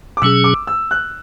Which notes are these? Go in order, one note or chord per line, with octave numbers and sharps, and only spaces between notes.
D6
B2 F#3 C#4 G#4 E6
D6
E6
F#6